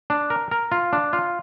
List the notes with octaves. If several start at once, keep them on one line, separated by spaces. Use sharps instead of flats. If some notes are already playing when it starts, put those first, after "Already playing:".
D4
A#4
A#4
F4
D4
F4